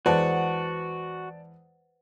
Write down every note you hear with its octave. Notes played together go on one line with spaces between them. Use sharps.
E2 G#3 F#4 B4 C5 D5 F#5 A5